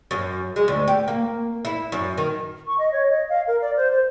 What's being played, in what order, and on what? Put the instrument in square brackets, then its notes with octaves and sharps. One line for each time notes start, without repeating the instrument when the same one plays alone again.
[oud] F#2
G#3
D2
G4
A#3
E4
F#2
D#3
[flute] C#6
D#5
C#5
D#5
F5
A#4
D5
C5
C5